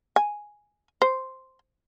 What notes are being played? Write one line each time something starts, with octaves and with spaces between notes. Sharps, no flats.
G#5
C5